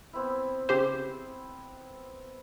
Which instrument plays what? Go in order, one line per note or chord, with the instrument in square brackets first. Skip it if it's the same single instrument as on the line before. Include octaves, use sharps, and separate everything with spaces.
[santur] B3 C4 E4
[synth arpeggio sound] C#3 G4 C5